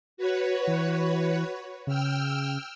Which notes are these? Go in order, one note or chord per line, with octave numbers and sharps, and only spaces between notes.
F#4 B4 C#5
E3
C#3 G5 E6 F6